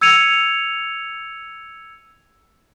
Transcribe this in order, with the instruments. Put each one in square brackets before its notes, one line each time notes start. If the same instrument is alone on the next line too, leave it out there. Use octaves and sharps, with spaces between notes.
[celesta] E6 G#6 C#7 D#7 F7